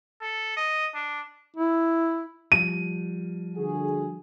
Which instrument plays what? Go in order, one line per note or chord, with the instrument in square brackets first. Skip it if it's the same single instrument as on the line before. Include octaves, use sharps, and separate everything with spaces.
[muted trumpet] A4
D#5
D4
[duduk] E4
[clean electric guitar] F3 G3 [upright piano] D#7
[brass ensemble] D3 F#4 G#4